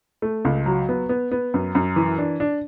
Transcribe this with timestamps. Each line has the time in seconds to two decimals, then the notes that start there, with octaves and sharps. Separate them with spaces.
0.22 A3
0.45 C#2
0.66 F#3
0.89 B3
1.09 B3
1.32 B3
1.54 F#2
1.75 F#2
1.96 E3
2.18 D4
2.40 D4